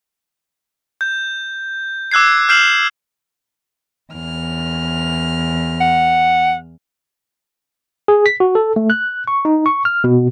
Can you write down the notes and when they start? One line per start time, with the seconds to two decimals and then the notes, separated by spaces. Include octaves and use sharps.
1.01 G6
2.11 D6 E6 F#6 G#6 C7
2.49 F6 G6 C7 E7 F#7
4.13 E2 F6
5.81 F#5
8.08 G#4
8.26 B6
8.40 F#4
8.55 A4
8.76 A3
8.90 F#6
9.28 C#6
9.45 D#4
9.66 C#6
9.85 F6
10.04 B2